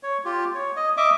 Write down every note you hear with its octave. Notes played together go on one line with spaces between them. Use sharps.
C#5
F4 G4
C#5
D#5
D#5 E5 D6